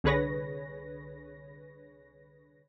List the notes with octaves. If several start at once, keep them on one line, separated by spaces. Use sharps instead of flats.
C2 D3 G#4 B4 C#5 A#6